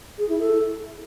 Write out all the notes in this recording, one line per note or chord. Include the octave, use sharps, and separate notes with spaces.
G#4
E4
A4